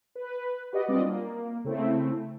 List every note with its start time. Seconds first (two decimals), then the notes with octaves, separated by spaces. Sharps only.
0.15 B4
0.72 F#4 G4 B4 D5 D#5 F#5
0.88 G3 C4 D4 F4 D5 D#5
1.01 A#3
1.64 C#3 A3 C4 E4